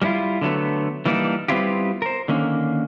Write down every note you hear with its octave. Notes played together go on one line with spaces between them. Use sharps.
G3 A#3 C#4 E4 F4
D3 F#3 A3 B3
E3 G3 A#3 B3 D4 D#4
G3 B3 C4 E4 F4 G4
A#4 C5
D3 D#3 A#3 C#4